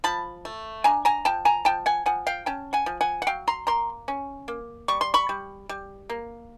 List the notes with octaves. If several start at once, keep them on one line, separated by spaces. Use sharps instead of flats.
F3 A5 B5
A3
D4 G#5 A#5
G#5 A#5
F3 G5 A5
G#5 A#5
F3 G5 A5
F#5 G#5
F3 F#5 G#5
F5 G5
C#4 G5 A5
F#5 G#5
F3
F#5 G#5
F#5
F#3 F5 G5
A#5 C6
A#3 A#5 C6
C#4
A#3
G3 C#6
C6
B5 C#6
G3
G3
A#3